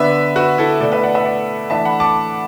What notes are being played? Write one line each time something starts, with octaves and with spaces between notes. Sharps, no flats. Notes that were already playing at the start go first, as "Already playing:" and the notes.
Already playing: D3 B3 D4 B4 E5
F#4 B4
E4 A4
B2 A3 D4 A4 D5
B4 E5
D5 F#5
B4 E5
D5 F#5
E3 A3 D4 E5 A5
F#5 B5
A5 D6